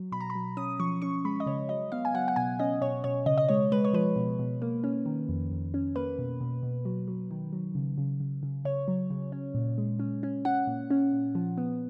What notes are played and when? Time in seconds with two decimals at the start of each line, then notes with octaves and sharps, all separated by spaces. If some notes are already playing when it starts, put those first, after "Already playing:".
Already playing: F#3
0.12 B2 B5
0.21 A#5
0.30 B5
0.35 F#3
0.57 C#4 D#6
0.80 F3 C#6
1.02 C#4 C#6
1.25 G#3 B5
1.40 D#5
1.46 C#3 C#5
1.69 F#3 D#5
1.92 B3 F5
2.05 G#5
2.14 F#3 F#5
2.28 F#5
2.36 B2 G#5
2.59 C#4 D#5
2.81 B2 C#5
3.04 B2 C#5
3.26 C#3 D#5
3.38 D#5
3.49 G#3 C#5
3.72 G#3 B4
3.85 C#5
3.93 F3 B4
4.16 B2
4.39 B2
4.62 A#3
4.84 C#4
5.06 D#3
5.29 F2
5.51 F2
5.74 C#4
5.96 A#3 B4
6.19 B2
6.41 B2
6.63 B2
6.85 F#3
7.08 F#3
7.31 D#3
7.53 F#3
7.75 C#3
7.98 C#3
8.20 C#3
8.43 C#3
8.65 C#3 C#5
8.88 F#3
9.10 C#3
9.32 C#4
9.55 A#2
9.78 G#3
9.99 C#4
10.23 C#4
10.45 C#4 F#5
10.67 A#2
10.90 C#4
11.13 A#2
11.35 F3
11.58 B3